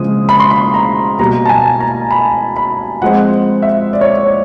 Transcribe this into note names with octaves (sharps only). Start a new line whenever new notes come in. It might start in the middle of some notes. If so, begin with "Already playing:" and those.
Already playing: C#3 F3 G#3 C4 D#6
B5
C6
B5
A#5
B2 G3 A#3 A#5
A5
G#5
A#5
B5
B5
F3 G#3 C4 F#5
E5
D5
C#5
D5